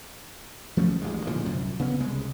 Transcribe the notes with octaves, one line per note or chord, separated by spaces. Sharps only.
F3 A3 C#4
A1 D2 G#3
A#2 D3 D#3 F3
C2 F#2 A#2
C#3 B3 C#4
C2 C#3 G#3